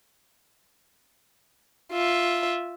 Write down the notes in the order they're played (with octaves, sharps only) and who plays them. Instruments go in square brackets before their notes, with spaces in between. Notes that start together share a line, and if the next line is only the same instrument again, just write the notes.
[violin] F4 E5